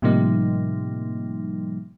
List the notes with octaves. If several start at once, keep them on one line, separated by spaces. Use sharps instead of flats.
A2 C3 F3 G3 A#3 D#4